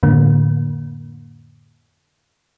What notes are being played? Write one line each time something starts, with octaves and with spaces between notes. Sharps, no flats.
F2 A2 D3 A#3